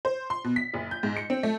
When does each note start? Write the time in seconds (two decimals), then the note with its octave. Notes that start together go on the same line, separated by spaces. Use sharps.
0.05 C5
0.30 C6
0.44 B2
0.56 B6
0.74 F#1
0.91 G6
1.03 G#2
1.17 C#7
1.30 C4
1.43 A3